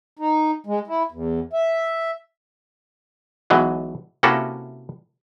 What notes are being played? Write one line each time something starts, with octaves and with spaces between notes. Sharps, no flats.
D#4
G#3
E4
E2
E5
B1 B2 E3 F#3 G#3
C3 A#3 C#4 E4 F#4 A4